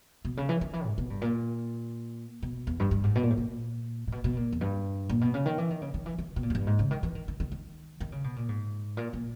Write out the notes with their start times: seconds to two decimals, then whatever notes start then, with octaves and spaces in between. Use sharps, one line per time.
0.25 B2
0.37 C#3
0.49 E3
0.61 D#3
0.73 E3
0.86 G#2
0.98 B2
1.10 G2
1.22 A#2
2.42 B2
2.67 E2
2.80 G2
2.91 G2
3.04 G#2
3.15 B2
3.23 A#2
3.30 G#2
3.37 A#2
4.08 A#2
4.12 B2
4.24 B2
4.36 A#2
4.52 E2
4.61 G2
5.09 A#2
5.21 B2
5.34 C#3
5.46 D#3
5.58 E3
5.70 D#3
5.82 C#3
5.94 D#3
6.06 E3
6.18 D#3
6.36 B2
6.43 A#2
6.50 G#2
6.55 G2
6.67 G#2
6.79 C#3
6.91 D#3
7.03 E3
7.15 D#3
7.28 D#3
7.40 D#3
7.52 D#3
8.00 D#3
8.12 C#3
8.24 B2
8.36 A#2
8.49 G#2
8.97 A#2
9.13 A#2